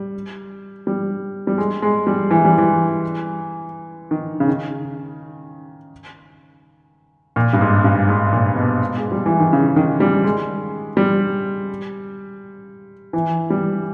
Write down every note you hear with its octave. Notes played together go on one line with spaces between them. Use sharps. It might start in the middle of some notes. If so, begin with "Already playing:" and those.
Already playing: G3
G3
G3
G#3
G#3
G3
E3
G3
E3
D#3
C#3
D#3
A#2
G2
G#2
G2
G#2
A#2
B2
G#3
G3
E3
D#3
C#3
D#3
G3
G#3
G3
E3
G3